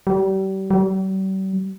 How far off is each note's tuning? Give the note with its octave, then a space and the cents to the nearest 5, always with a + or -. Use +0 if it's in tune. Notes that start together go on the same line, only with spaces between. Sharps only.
G3 -35
G3 -45